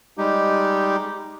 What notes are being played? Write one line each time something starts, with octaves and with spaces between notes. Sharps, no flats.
G3 G#3 D#4 G4